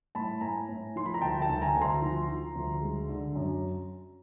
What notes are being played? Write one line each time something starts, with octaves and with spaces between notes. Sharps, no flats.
A2 A5 B5
A2 G#5 A#5
A2
F3 C6
B5
A#5
D2 G5 A5
G5 A5
D2
G#5 A#5
D2
A#5 C6
F3
F3
D2
G#3
D3
F#2